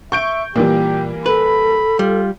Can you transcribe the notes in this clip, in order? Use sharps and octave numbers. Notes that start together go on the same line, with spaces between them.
E5 C#6 G6 D7
A#2 E3 G3 A#3 G4
A4 B4 B5
G3 F4